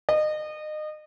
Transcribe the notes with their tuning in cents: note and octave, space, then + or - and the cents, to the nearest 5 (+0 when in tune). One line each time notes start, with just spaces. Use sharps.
D#5 -30